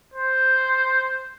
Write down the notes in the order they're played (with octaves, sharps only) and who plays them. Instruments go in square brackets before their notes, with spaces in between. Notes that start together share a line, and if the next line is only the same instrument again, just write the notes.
[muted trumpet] C5